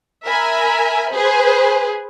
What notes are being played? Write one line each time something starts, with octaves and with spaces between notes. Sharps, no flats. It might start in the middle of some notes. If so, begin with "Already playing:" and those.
A#4 E5 G#5 B5
G#4 B4 C5